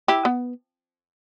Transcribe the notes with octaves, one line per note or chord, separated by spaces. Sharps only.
E4 G4
B3